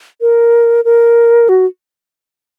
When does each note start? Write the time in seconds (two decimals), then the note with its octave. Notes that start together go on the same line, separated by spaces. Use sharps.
0.21 A#4
0.85 A#4
1.49 F#4